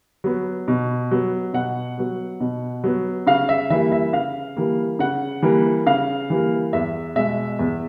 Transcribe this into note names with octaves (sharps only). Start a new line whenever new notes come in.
F#3 B3
B2
F#3 B3
B2 F#5
F#3 B3
B2
F#3 B3
C#3 F5
E5
E3 G3 A#3 E5
E5
C#3 F5
E3 G3 A#3
C#3 F#5
E3 G3 A#3
C#3 F5
E3 G3 A#3
E2 E5
B2 G#3 E5
E2